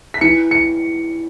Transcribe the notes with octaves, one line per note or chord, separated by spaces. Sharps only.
B6
E3 C#7
C#7